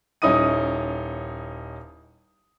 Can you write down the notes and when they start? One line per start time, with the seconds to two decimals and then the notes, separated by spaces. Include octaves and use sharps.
0.22 D#1 C#4 D#4 E4 D#6 D#7